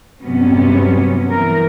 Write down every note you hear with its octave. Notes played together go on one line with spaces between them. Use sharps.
G2 C3 F#3 B3 C#4
E3 A#4